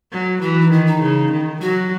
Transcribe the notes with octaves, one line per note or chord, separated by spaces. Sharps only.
F#3
E3 F#4
D#4
D#3 E4
D#4
C#3
D#3
F#3 F#4